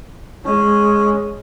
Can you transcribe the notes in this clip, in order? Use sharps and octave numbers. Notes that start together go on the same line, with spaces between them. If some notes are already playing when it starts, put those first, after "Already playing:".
G#3 C#4